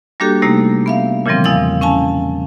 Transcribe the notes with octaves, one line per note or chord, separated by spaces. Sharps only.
G3 A#3 D4 F#4 G4 A4
C3 G3 A3 A#3 D#4
B3 E5 F5
A#2 C#3 E3 F3 G3 C4
E2 E4 F5 D#6 A6
C#4 F5 G#5 A5